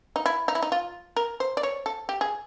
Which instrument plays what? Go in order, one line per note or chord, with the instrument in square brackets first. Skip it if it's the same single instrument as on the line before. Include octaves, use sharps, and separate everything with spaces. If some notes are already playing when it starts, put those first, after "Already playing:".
[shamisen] D#4
E4
D#4
E4
D#4
F4
A#4
C5
D5
C#5
A4
G4
G#4